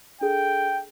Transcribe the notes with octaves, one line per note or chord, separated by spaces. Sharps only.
D4 G#4 A4 G5